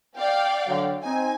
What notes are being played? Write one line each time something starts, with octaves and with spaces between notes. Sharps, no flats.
D5 F5 G5
D3 F#3
C4 D#4 G#5